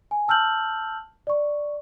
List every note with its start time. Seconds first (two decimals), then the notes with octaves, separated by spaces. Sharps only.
0.11 G#5
0.28 A5 E6 F6 G6 F#7
1.27 D5 C#6